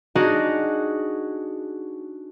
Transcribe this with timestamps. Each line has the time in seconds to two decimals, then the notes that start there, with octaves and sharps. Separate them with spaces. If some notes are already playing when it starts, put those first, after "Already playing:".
0.15 D4 D#4 F#4 G#4